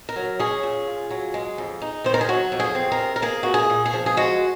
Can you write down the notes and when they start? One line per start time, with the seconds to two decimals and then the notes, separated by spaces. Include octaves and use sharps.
0.09 A#4
0.16 F#3
0.39 C#4 G#4
0.63 A#2
0.87 F4
1.10 F#3
1.34 G#3
1.58 F2
1.82 D#4
2.04 D#3 C5
2.14 A#4
2.21 G#4
2.29 F#3 F#4
2.52 F2
2.60 G#4
2.75 C4
2.92 A#4
2.99 C3
3.16 A#4
3.22 A#3 G#4
3.43 A#2 F#4
3.54 G#4
3.70 A#2
3.86 G#4
3.93 F3
4.06 G#4
4.17 G#3 F#4